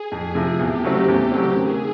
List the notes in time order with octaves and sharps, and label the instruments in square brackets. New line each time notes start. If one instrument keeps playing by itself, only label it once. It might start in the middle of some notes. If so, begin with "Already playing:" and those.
Already playing: [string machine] G#4
[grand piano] F2
C3 F3
[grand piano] E2 [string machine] G4
[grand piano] C#3 F#3 A3 C4
E2
C#3 F#3 A3 C4
[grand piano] D#3 [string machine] G#4